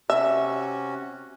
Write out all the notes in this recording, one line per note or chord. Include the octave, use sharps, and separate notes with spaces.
C3 C#4 F#4 E5